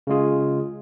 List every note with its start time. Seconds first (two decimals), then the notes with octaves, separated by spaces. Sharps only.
0.07 C#3 G#3 F4 G#4